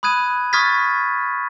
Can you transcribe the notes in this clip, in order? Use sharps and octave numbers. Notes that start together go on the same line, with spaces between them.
B5 D#6 F#6 G#6 D#7
C#6 D#6 F6 G#6 A6 B6